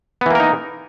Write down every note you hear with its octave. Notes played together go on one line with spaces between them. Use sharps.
E3 A#3 B3 D#4 A#4